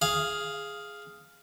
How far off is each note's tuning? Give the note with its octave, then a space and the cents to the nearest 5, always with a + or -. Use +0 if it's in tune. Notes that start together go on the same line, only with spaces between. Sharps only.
G#4 +0 F5 +0